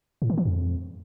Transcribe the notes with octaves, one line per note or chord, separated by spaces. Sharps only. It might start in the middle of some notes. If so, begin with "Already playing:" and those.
A2
D#3
E3
F2